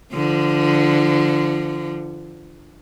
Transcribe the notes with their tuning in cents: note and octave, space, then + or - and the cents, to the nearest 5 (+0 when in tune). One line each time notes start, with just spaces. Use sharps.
D3 +0 F3 -25